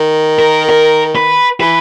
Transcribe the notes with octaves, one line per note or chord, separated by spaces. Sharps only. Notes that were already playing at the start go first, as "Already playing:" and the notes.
Already playing: D#3
A#4
A#4
B4
E3 B4